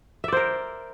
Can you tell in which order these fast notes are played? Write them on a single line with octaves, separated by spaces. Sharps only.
E5 D5 C5 A#4